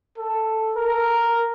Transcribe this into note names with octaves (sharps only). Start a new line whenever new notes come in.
A4
A#4